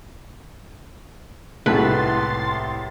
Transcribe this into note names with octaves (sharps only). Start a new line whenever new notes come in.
C2 A2 G#3 A3 F#4 B4 C6 A6